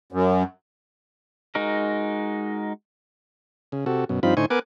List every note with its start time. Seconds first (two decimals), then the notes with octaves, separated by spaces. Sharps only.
0.12 F#2
1.55 G#3 D#4 F#4 A#4
3.72 C#3
3.86 C3 F#4 A4
4.09 F#2 B2
4.23 G2 F3 C4 D#4 F4 B5
4.37 A2 D3 D#4 C5 G#5 C#6
4.50 B3 A#4 B4 F#5 G#5 D6